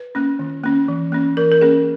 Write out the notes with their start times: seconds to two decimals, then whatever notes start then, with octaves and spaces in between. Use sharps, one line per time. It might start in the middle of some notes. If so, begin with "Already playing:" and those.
Already playing: B4
0.15 A#3 C#4
0.39 D#3
0.64 A#3 C#4
0.88 E3
1.12 A#3 C#4
1.37 E3 A#4
1.52 A#4
1.61 A#3 C#4 G#4